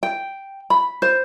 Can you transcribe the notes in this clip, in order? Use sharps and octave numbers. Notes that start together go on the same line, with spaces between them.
G5
B5
C5